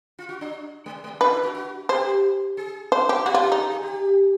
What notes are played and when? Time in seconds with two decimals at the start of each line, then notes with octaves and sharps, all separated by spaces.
0.19 F4
0.29 F#4
0.41 D4
0.86 G#3
1.04 G#3
1.21 D4 B4
1.32 E4
1.43 F#4
1.55 F#4
1.89 G4 C5
2.57 G#4
2.92 C5
3.09 G4
3.26 F#4 G4
3.34 F4
3.43 G#4
3.52 D#4
3.60 G#4
3.71 G#4
3.83 G4